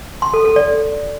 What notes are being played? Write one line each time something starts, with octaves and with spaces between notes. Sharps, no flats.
C6
A4
A4
D5